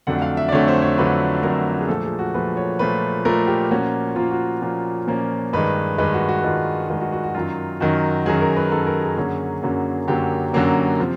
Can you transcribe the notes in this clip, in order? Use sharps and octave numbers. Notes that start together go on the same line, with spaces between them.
F2 D3 F#3 A3 D4 F#5
F5
E5
D5
F2 D3 F#3 A3 D4 C#5
C5
C#5
F2 D3 F#3 A3 D4 B4
F2 D3 F#3 A3 D4 A#4
G#4
A#2 F3 A3 A4
G#4
F#4
A#2 F3 A3 B4
C#5
A#2 F3 A3 B4
A#2 F3 A3 A#4
G4
A#2 F3 A#3 C#4 F#4
A#2 F3 A#3 C#4 F4
F#4
A#2 F3 A#3 C#4
A#2 F3 A#3 C#4
G2 D#3 G#3 B4
G2 D#3 G#3 B4
F#4
F#4
G2 D#3 G#3 F4
G2 D#3 G#3 F#4
F#4
F#4
F#4
F#2 D#3 F#3 F4
F#2 D#3 F#3 F#4
F#2 D#3 F#3 G#4
A#4
B4
F#2 D#3 F#3 A4
A#4
G#4
F#2 D3 F#3 A#3 C#4
F#2 D3 F#3 A#3 C#4
F#2 D3 F#3 A#3 C#4 G4
F#2 D3 F#3 A#3 C#4
C3 F3